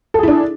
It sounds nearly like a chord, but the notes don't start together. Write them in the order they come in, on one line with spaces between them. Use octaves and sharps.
A4 G#4 E4 D4